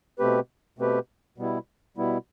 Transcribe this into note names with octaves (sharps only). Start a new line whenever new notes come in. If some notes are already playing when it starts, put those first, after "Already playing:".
B2 A3 C4 G4 B4
B2 A3 C4 G4 B4
B2 G3 B3 E4
B2 G3 B3 E4